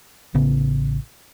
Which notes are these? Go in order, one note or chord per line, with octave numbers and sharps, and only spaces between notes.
A1 C#3 B3